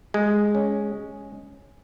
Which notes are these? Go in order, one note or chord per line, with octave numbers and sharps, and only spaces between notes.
G#3
C#4